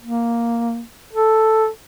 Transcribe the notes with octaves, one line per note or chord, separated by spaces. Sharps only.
A#3
A4